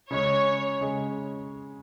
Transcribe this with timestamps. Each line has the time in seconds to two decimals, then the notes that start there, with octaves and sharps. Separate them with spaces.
0.10 C#3 G#3 C#4 C#5
0.81 C#3 G#3